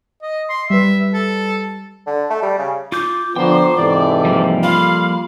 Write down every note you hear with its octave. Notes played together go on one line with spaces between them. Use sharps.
D#5
C6
G3 B4 E5
A4
D3
A3
G3
C#3
F4 D6 G6
D3 F3 B3 C5 G5 A#5
G#2 C3 E3 A4 D5
F3 G3 A#3
F4 A4 F5 B5